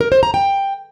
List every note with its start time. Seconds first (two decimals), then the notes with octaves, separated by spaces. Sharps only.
0.01 A#4
0.12 C5
0.23 A#5
0.34 G5